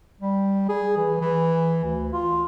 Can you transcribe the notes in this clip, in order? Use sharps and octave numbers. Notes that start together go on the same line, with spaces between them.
G3
G#4
E3
E3
D2
F4